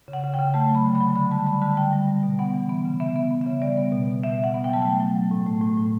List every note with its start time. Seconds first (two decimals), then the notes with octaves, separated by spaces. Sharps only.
0.08 C#3
0.13 F#5
0.24 C#3
0.34 G5
0.39 C#3
0.54 A3 A5
0.69 F#3
0.75 B5
0.85 D3
0.95 B5
1.00 F#3
1.16 D3 B5
1.31 G3 A5
1.46 D3 B5
1.62 D3 A5
1.77 G3 G5
1.93 G3
2.08 G3
2.23 B2
2.39 B3 F#5
2.54 E3
2.69 B3
2.85 C#3
3.00 B3 E5
3.16 B3
3.31 B3
3.41 E5
3.47 C#3
3.62 G3 D5
3.77 B3
3.92 B2
4.08 B2
4.23 B2 E5
4.38 B2
4.44 F#5
4.54 B3
4.64 G5
4.69 F#3 A5
4.82 A3 G5
5.00 F#3
5.15 F#3
5.31 A2
5.47 A3
5.61 A2
5.77 A2